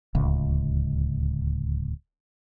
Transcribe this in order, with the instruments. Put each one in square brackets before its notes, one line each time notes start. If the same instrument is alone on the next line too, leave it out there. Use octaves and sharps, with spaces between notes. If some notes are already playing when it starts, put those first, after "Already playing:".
[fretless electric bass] D1 C#2